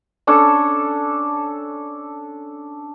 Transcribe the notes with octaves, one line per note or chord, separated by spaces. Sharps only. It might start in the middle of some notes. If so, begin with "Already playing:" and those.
C#4 D4 A4 C#6